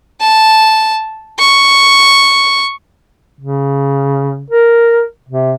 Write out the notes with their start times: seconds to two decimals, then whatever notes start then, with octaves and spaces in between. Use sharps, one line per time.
0.21 A5
1.39 C#6
3.41 C#3
4.50 A#4
5.29 C3